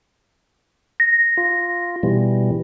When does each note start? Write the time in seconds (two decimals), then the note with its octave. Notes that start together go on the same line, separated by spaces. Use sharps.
1.00 A#6
1.37 F4
2.03 B2 E3 G3